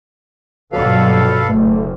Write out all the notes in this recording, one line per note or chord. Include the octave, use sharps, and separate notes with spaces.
A#1 G2 B2 F#3 A4 B4 F5
F#1 A3